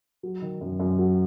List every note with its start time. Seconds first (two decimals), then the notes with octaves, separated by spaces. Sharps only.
0.23 F#3
0.42 D#3
0.61 F#2
0.80 F#2
0.99 F#3